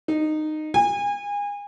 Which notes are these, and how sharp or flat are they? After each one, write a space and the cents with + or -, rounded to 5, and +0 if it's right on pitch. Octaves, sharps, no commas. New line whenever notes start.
D#4 -15
G#5 -30